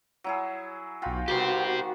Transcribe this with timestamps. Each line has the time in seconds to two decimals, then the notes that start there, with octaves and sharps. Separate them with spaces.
0.24 F#3 E4 G#4
1.02 B1 F4 F#4 G5 B5
1.28 D#3 G3 B3 F#4 G4 C5